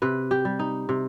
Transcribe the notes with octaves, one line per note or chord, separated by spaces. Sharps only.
C3 B4
G4
G3
D#4
C3